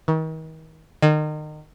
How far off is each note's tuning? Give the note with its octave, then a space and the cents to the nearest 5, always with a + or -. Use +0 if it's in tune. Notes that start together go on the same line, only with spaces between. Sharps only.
D#3 +40
D#3 -30